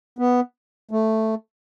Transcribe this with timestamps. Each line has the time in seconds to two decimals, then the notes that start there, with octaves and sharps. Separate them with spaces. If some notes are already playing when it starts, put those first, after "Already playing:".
0.19 B3
0.91 A3